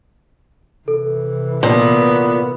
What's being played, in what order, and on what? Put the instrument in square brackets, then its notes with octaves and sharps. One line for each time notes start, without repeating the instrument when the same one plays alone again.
[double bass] C3 E3 [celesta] A4
[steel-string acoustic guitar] A#2 [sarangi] B3